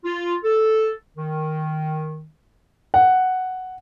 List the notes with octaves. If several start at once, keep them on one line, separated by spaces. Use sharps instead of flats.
F4
A4
D#3
F#5